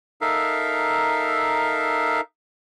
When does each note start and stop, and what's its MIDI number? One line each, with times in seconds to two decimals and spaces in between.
0.21 2.21 63
0.21 2.21 69
0.21 2.21 70
0.21 2.21 76
0.21 2.21 77